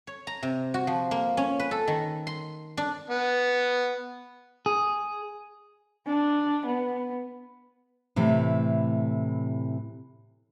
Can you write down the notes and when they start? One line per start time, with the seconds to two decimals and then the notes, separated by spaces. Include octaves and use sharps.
0.07 C#5
0.27 A#5
0.43 C3
0.74 F#4
0.87 F3
1.11 A#3
1.37 C#4
1.59 B4
1.71 A4
1.88 D#3
2.27 C6
2.77 D4
3.10 B3
4.66 G#4
6.07 D4
6.66 B3
8.16 A2 C3 E3 A3